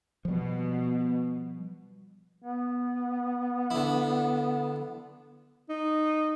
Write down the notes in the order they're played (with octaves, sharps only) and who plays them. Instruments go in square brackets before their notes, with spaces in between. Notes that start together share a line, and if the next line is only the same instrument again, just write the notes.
[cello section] B2 [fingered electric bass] F3 G3
[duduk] B3
[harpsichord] D3 E4
[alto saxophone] D#4